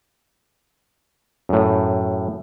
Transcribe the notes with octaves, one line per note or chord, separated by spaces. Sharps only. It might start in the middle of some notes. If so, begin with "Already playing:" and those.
F#2 A2